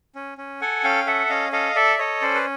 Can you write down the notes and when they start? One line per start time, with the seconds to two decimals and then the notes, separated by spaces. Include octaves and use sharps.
0.15 C#4
0.38 C#4
0.61 A4 F#5 G#5
0.84 C#4 F5 G5
1.06 A4 E5 F#5
1.30 C#4 D#5 F5
1.52 A4 D#5 F5
1.75 A4 D5 E5
1.99 A4 C#5 D#5
2.22 C#4 C5 D5
2.35 B4